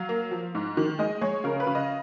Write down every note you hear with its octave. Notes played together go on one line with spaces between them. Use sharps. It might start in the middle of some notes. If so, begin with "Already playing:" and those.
Already playing: F#3 F5
A#3
F3
G#2
D#3
G#3 D#5
G#3 C#5
C#3 A#4
B4
C#3
D#5